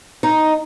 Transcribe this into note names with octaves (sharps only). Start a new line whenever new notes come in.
D#4